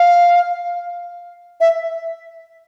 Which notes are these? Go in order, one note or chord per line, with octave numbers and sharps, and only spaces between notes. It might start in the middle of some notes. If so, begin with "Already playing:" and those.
Already playing: F5
E5